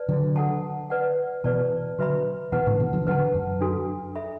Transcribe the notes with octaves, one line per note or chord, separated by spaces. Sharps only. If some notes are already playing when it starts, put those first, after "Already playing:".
Already playing: B4 D5 A5
D3 F#3
A4 F#5 A5
B4 D5 F#5
B2 E3 B4 D5 A5
D3 F#3 F#4 B4 E5 B5
B2 E3 B4 F#5 A5
A2 D3
B2 E3
D3 F#3
D3 F#3 B4 F#5 A5
F#2
D4 F#4 A4
A4 E5 B5